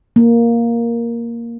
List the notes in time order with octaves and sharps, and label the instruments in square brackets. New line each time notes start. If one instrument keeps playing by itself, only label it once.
[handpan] A#3